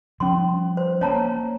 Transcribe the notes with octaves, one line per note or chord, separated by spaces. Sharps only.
F3 G3 C#4 C6
C5
A#3 C#4 C#5 A5 A#5